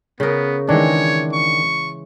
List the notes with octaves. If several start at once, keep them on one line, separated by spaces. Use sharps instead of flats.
C#3 B3 A#4
D#3 E3 G#3 D4 C#5
C#6